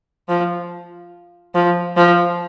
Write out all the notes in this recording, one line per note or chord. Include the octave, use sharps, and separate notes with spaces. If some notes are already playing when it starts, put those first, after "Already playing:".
F3
F3
F3